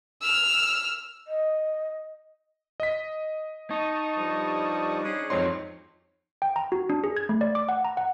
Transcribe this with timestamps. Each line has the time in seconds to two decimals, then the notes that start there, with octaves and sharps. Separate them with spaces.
0.22 E6 F6
1.28 D#5
2.80 D#5 B6
3.70 D#4 A5 C#6 D#6
4.16 G2 F3 G3
5.04 C#4 D4 G#4
5.30 F2 G#2 F#3 C4 D#4 C#5 C6
6.42 G5
6.56 A#5
6.72 F#4
6.90 D4
7.04 G#4
7.17 G#6
7.29 A3
7.41 D5
7.55 D6
7.69 F#5
7.85 A#5
7.97 F#5